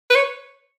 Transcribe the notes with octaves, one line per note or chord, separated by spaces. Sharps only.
B4
C#5